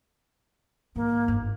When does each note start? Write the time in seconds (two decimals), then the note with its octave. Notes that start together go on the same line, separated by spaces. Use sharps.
0.96 G#2 D#3 A#3
1.28 G1 G#2